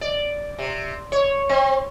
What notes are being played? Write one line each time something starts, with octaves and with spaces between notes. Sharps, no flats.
D5
C3
C#5
C4